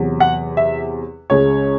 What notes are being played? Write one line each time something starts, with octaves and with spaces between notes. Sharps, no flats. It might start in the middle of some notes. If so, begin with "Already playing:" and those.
Already playing: E2 C3 F#3
F#5
E5
C#2 C#3 G#3 C#5